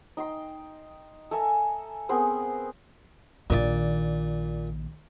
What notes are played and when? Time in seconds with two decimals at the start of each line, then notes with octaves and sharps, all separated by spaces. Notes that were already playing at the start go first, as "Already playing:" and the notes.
0.17 D#4 G5 C6
1.31 A4 E5 G#5 A#5
2.09 B3 C4 G#4 A#4
3.50 A#1 A#2 D#3 D5